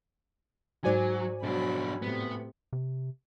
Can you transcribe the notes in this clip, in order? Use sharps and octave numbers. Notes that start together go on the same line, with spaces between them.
G#2 F#3 F#4 C5 D5 G#5
B2 F3 F#3 D4 B5
A2 C3 B3
C3